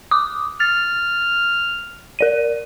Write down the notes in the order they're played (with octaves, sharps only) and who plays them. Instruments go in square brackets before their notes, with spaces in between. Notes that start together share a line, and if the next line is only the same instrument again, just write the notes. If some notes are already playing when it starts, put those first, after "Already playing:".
[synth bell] D6 D#6
[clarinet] F6 [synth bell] A6
[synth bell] A#4 D5 D#7